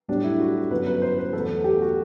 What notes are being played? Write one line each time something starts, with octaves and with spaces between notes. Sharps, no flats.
B1 A2 G3 D4
E4
F#4
G1 F#2 F#3 B4
B4
C5
B4
E2 B2 F#3 A3 A4
G4
F#4